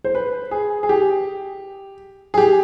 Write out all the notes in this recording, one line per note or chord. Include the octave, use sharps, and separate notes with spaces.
C5
B4
G#4
G#4
G4
G#4
G4